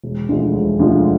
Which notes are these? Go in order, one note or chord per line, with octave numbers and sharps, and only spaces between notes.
E1
D2 D3 F3 G#3
E1
D2 D3 F3 G#3